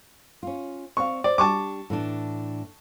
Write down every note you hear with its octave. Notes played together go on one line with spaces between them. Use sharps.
C#4 F4
C4 D5 F5 C#6
C5 D5
G3 D4 A5 C#6 D6
A2 E3 D4